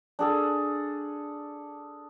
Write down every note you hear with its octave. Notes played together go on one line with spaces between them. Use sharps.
D4 G#4 A4